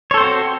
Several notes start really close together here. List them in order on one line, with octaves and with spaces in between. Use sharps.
C#5 A4 C5 C4 F#4